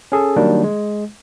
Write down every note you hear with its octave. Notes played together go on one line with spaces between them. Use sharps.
C#4 G#4 A4
D#3 F#3 G3 A#3 D4
G#3